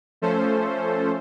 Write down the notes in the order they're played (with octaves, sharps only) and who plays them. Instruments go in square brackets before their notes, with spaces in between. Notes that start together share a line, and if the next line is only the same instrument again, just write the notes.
[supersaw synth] F3 A3 C#4 A4 C5